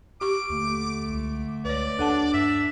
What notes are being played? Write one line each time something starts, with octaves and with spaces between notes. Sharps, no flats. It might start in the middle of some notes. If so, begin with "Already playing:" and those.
G4 C#6 D6
D#2 D3 A3
C#2
C#2 B4 C#5 D5
D#2 D4 A4 F#5 A5
G2 E5